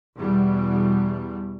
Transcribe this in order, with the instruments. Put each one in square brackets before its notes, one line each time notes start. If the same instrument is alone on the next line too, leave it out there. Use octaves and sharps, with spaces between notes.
[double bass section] E2 B2 G3